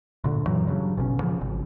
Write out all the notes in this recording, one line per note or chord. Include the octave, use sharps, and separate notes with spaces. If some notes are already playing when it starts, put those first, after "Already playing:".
D2 A#2 D3
F#2 E3 F#3
G2 C#3 F#3
A1 B2 C4 C#4
C#3 F3
G#1